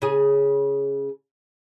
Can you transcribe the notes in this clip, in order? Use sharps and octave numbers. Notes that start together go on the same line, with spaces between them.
C#3 G#4